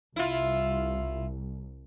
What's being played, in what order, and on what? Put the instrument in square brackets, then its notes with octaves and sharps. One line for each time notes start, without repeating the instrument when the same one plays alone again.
[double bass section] C2 [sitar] E4 F4